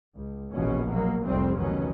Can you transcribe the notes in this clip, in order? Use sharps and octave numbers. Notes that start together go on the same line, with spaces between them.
C#2
F1 A#1 B2 E3 C#4
B2 F#3 A#3
F1 C2 F2 C3 G3 C4
F1 C#2 B2 D#3 F#3 C#4